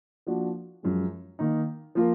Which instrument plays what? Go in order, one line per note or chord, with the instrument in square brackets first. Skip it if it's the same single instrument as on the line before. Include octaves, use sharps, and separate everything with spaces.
[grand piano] F3 A#3 D4 F#4
F#2 F3 G#3
D#3 A#3 D#4
F3 A#3 F4 A#4